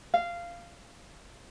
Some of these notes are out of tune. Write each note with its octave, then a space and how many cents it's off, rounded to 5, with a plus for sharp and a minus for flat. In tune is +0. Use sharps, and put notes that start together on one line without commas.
F5 -15